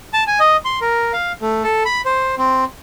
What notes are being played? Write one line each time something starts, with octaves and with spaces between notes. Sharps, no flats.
A5
G#5
D#5
C6
A#4
F5
A3
A4
B5
C5
C4